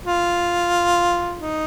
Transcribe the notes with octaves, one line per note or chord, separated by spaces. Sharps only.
F4
D#4